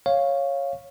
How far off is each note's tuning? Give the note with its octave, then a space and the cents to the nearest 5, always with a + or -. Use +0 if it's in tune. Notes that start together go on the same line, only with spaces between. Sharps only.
C#5 -5 F5 +0